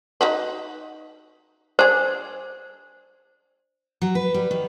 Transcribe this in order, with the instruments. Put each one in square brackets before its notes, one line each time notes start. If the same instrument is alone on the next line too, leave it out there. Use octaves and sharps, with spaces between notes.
[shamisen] D#4 F#4 B4
[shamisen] D4 G#4 [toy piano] C5
[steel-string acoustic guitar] F#3
B4
G3
D#3